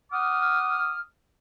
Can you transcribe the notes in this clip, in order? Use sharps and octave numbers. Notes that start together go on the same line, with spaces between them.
F#5 D6 D#6 F6